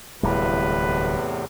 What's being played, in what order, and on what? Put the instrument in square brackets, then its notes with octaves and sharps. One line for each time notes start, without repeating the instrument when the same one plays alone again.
[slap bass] D1 G3 [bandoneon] E2 A2 C3 [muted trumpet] B4